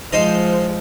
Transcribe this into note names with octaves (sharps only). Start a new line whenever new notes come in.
F3 G#3 D#4 C5 D#5